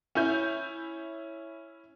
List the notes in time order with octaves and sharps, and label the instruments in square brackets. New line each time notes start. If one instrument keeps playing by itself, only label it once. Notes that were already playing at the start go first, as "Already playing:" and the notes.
[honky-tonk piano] C#4 E4 G6